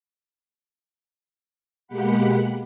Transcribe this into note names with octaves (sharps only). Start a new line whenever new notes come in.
B2 G#3 A#3 G4 F#5 B5